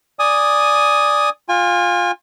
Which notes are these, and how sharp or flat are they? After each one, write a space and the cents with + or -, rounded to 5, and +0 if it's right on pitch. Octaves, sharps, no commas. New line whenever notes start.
D5 +0 G#5 +0 D#6 +0
F4 +15 G#5 -35